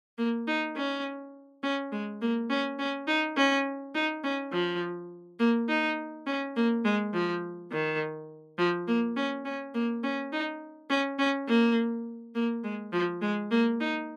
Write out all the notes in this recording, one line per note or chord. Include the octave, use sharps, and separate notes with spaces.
A#3
D#4
C#4
C#4
G#3
A#3
C#4
C#4
D#4
C#4
D#4
C#4
F3
A#3
D#4
C#4
A#3
G#3
F3
D#3
F3
A#3
C#4
C#4
A#3
C#4
D#4
C#4
C#4
A#3
A#3
G#3
F3
G#3
A#3
D#4